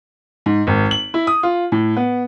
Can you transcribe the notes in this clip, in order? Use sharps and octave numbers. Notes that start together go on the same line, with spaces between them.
G#2
G#1
F#7
E4
D#6
F4
A2
B3